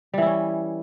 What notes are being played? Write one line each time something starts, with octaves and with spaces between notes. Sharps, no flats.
E3 G3 C#4 E4